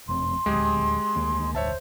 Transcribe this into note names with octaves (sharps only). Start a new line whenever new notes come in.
F#1 F2 C4 C6
D#1 D2 G#3 G4 G#4
D2 D#3 A#3
F1 D2 C5 C#5 E5 A5